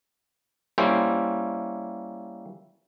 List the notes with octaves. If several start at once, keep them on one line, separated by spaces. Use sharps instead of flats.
G3 A#3 C#4 E4 C5